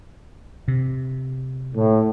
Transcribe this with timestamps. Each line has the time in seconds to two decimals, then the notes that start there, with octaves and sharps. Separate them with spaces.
0.68 C3
1.74 A2